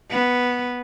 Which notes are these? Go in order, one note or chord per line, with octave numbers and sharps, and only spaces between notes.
B3